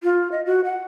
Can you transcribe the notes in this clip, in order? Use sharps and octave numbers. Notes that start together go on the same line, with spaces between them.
F4
D#5
F#4
F#5